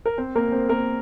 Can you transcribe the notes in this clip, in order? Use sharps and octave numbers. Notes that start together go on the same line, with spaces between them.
A#4
C4 C5
A#3 A#4
C4 C5
A#3 A#4